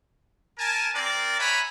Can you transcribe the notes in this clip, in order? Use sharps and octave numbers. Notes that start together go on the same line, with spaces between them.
A#4 G#5 A5
C4 A#4 D5
C#5 E5 F#5 G#5 A#5 B5